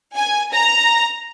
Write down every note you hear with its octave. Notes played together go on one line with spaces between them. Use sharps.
G#5
A#5